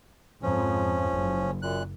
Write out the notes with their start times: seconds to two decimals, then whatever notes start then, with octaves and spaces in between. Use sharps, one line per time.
0.43 F2 G#2 F3 C#4
1.10 F#1
1.62 F#2 A#2 F#6